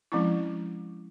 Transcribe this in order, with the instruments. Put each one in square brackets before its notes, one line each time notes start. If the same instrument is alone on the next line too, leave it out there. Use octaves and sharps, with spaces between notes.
[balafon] F3 G#3 C4 C#4 E4